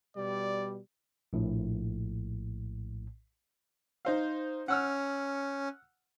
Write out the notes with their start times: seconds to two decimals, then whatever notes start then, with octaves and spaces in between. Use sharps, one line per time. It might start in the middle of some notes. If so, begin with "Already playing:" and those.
0.16 B2 G3 D5
1.33 A#1 A2
4.05 D#4 C5 F5
4.68 C#4 F#5 E6 F6